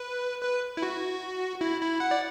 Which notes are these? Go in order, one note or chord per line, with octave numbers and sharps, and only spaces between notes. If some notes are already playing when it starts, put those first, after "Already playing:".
Already playing: B4
B4
E4
F#4
E4
E4
F#5
D5